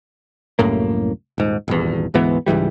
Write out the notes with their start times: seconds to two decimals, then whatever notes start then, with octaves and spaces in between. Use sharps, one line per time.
0.59 C2 F#2 A2 A#3
1.38 D#1 G#2
1.68 D#1 G#1 E2
2.14 D2 G#2 E3 B3
2.46 C#2 G#2 E3 G3